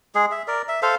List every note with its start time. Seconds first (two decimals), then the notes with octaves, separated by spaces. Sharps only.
0.15 G#3 G#4
0.31 E5
0.48 A#4 D5
0.68 E5
0.82 A4 C5 F5